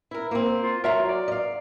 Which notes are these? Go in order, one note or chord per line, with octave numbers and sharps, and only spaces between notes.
E4 A#4
A#3 C4
F4
F#3 F4 A#4 E5 A#5
D5
D#5 F5